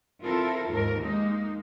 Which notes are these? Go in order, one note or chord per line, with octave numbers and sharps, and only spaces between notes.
C4 E4 F4 A4 A#4
D#2 G#2 A#4
G#3 A#3 D#4